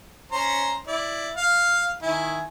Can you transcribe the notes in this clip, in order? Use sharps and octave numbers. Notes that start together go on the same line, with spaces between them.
C#4 C5 A#5
E4 D5
F5
D#3 E4 G#5